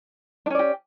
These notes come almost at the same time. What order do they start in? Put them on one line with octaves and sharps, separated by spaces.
D4 C#4 D5 G4